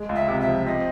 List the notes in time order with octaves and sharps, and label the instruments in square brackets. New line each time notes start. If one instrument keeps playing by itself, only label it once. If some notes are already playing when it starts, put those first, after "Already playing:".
Already playing: [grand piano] G#3
C#2
[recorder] E5
[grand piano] C3
[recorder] E5
[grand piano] F3
[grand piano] C4 [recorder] D#5